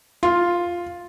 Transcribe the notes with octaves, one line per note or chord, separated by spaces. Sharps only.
F4